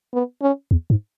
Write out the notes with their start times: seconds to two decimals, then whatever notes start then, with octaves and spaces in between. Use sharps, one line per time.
0.13 B3
0.42 C#4
0.71 E2
0.90 G#2